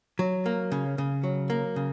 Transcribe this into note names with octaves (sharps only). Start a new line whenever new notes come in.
F#3
A#3
C#3
C#3
F#3
A#3
C#3